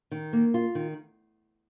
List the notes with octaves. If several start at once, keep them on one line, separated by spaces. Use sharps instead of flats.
D#3
A#3
F4
D#3